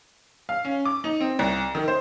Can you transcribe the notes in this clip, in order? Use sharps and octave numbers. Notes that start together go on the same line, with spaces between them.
F5
C#4
D6
D#4
C4
C2
D#3
C5